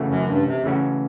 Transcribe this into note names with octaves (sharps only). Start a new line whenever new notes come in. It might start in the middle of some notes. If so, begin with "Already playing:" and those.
Already playing: C#3 E3 A3 C#4 F#4
F#2
G2
C3
C#3 E3 A3 C#4 F#4